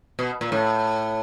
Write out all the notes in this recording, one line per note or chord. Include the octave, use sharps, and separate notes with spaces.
B2
A#2
A2